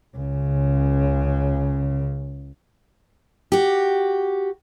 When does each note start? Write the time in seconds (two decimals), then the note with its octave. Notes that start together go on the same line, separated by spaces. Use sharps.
0.17 C#2 C#3
3.52 F#4 G4